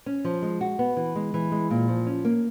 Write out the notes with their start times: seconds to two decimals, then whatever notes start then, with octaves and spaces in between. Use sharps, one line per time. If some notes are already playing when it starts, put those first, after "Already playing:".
0.06 C#4
0.25 F3
0.42 G#3
0.61 F#4
0.79 B3
0.97 E3
1.15 G#3
1.34 E3
1.52 G#3
1.71 A#2
1.88 F3
2.06 C#4
2.25 A#3